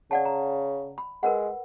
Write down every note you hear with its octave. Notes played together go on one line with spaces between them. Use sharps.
C#3 D5 F#5 A5
A#5
B5
G#3 A#4 B4 F#5